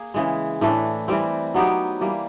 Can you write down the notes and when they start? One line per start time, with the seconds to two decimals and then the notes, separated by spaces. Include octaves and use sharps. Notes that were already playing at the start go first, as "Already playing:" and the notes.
Already playing: A#3 G#4
0.14 C#3 E3 G#3
0.61 A2 E3 A3 D4
1.08 E3 G3 C4
1.54 F#3 B3 D#4 G4
2.01 E3 G3 A#3